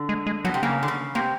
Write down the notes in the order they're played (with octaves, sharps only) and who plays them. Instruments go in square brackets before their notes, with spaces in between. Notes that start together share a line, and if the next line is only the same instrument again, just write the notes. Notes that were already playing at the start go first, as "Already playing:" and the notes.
Already playing: [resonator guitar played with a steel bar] D3
[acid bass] G#3
G#3
[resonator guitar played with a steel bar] B2 [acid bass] F#3
[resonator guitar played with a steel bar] C3
[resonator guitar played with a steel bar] C#3 [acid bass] A#3
[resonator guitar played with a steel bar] D3
C#3
[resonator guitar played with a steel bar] C3 [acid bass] A#3